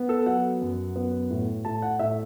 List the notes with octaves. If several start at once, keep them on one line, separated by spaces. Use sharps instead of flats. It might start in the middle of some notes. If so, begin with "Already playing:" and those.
Already playing: B3
A4
F#3 F#5
F#2
B3
A2
A2 A5
F#5
A2 E5